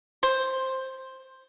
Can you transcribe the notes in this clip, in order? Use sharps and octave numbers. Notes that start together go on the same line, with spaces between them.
C5